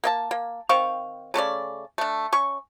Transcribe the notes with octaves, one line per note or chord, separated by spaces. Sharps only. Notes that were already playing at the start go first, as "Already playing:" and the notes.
A#3 E5 A5
A#3
D#3 C4 F5 C#6
C#3 A3 C#4 D5
A3 D4
C#4 C#6